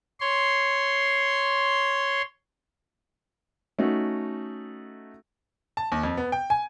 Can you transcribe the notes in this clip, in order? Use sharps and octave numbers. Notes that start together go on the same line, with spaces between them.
C#5 C6
A3 C#4 D#4 F#4 A4
A5
D#2
F2
B3
G5
G#5